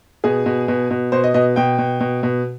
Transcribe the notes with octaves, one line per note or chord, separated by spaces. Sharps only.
B2 G#4
B2
B2
B2
B2 C5
D#5
B2 D#5
B2 G5
B2
B2
B2